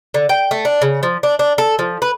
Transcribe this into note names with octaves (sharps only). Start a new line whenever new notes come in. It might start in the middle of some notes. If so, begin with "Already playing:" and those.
D3
G5
A3
D4
C#3
F3
D4
D4
A4
F3
B4